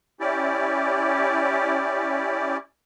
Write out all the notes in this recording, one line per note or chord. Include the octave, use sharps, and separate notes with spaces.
C#4 E4 G4 D5